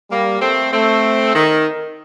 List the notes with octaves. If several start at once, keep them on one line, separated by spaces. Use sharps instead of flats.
G3 A#3
A3 C4
A3 C4
D#3